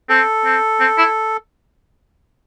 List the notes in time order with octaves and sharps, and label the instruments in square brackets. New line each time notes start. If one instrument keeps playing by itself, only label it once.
[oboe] C4 [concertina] A4
[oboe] C4
C4
E4